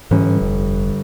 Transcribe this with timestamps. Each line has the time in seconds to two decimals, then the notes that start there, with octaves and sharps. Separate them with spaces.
0.11 G1 G#2 E3 C#4
0.41 F1 G3